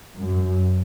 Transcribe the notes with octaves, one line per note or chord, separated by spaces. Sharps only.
F#2